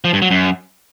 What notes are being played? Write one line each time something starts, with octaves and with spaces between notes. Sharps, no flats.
F3
G2
F#3
F#2